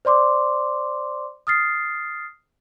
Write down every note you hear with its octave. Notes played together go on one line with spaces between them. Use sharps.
C5 D5 C6 D6
D#6 F6 A6 C7